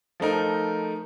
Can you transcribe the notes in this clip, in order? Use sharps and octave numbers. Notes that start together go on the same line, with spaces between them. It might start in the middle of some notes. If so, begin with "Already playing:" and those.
F3 A3 D#4 A#4